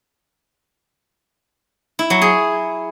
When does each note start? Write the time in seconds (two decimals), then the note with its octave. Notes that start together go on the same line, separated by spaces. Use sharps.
1.99 E4
2.10 F#3
2.21 G#4